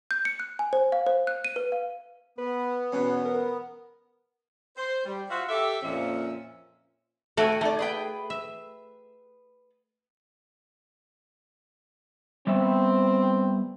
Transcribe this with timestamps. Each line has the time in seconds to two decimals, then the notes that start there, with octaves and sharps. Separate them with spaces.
0.11 G6
0.25 C#7
0.40 F#6
0.59 G#5
0.73 C5
0.92 F5
1.07 C5
1.27 F#6
1.45 D#7
1.56 B4
1.72 F5
2.38 B3 B4
2.92 E2 B2 C#4
3.25 A#4
4.77 C5
5.05 G3
5.30 F4 F#4 C5 E5 F#5
5.48 G4 A4 E5
5.82 F2 A#2 F3 A#3 C#4 E5
7.37 A3 F#4 A4 G5 G#5
7.61 A3 D#4 D5
7.79 G#4 B4 G5
8.30 E5
12.47 G3 B3 C4 E5